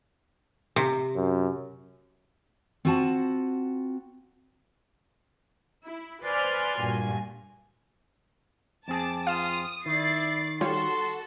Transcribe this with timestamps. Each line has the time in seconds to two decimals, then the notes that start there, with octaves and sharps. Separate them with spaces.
0.76 C3
1.16 F#2
2.85 C4 F4 F#4 F#5 G5 A5
5.84 E4
6.24 B4 C5 D5 G#5 C6 F6
6.80 G2 A#2 F#4 G#5
8.88 F2 C4 G#4 A5 D6
9.27 F4 F5 D#6 E7
9.86 D#3 E4 D5 A6 C7
10.61 G3 F4 F#4 A4 C#5 C6